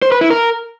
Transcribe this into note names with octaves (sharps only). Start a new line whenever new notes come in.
C5
B4
E4
A#4